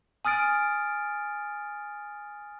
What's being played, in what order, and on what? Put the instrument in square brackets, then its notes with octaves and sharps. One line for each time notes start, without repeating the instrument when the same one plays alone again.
[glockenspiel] G#5 D#6 F6 A6 D7